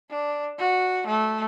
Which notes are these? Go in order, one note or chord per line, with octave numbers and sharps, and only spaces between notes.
D4
F#4
A3